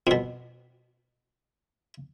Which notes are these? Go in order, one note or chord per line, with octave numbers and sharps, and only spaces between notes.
F2 B2